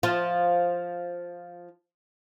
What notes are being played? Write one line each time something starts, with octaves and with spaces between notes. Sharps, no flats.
F3 F4